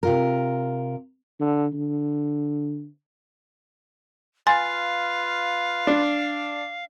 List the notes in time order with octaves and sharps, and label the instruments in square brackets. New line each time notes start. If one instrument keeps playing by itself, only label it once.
[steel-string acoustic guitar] C3 F4 A#4
[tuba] D3
D3
[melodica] F4 B4 [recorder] F5 [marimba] G#5 C6 A6
[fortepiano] D4